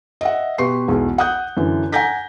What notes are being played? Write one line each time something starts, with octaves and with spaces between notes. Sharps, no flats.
D#5 E5 F#5
B2 G4 B4 C6 C#6 C7
B1 E2 G#3
F#5 D#6 F#6 G6
F#2 D3 E3
F#5 G#5 A#5 G6 A#6 B6